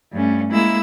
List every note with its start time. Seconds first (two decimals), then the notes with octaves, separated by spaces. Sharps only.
0.11 G2 A3 C#4
0.51 G#3 A#3 E4 E6